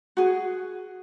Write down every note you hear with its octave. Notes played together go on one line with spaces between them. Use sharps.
F#4 G#4